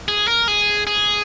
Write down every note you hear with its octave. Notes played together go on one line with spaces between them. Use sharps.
G#4
A#4
G#4
G#4